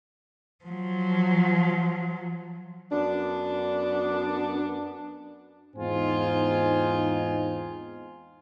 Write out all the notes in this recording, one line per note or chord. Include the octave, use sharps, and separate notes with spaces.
F3 F#3
F#2 B3 D4
E2 G#2 C4 D#4 F4 G#5